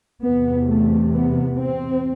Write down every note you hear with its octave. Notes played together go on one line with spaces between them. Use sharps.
E2 C3 B3
A3
B3
C4